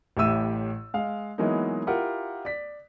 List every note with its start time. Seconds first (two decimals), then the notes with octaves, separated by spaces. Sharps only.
0.17 A1 A2 G4 E5 E6 D#7
0.94 G#3 F5
1.38 E3 F#3 G#3 A#3 B3 D#4
1.87 E4 F4 G4 A#4 F#5
2.45 D5 B6